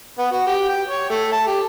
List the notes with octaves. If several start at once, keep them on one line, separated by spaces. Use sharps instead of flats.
B3
F#4
G4
G5
C#5
A3
A5
G4